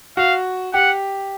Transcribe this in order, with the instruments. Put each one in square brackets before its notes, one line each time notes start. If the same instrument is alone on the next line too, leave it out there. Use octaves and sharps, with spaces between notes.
[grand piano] F#4 [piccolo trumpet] F5
[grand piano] G4 [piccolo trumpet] F#5